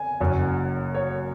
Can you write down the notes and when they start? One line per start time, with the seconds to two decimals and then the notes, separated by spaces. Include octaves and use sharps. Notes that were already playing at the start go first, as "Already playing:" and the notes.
Already playing: G#5
0.20 F#1 F#2 F#3 C#4
0.95 C#5